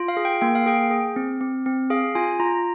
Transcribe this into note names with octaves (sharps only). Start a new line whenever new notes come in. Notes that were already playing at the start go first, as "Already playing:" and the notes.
Already playing: F4
F5
G#4
G5
A#3 G5
F5
G#4 G5
G#4
C4
C4
C4
G#4 F5
F4 G#5
F4 A#5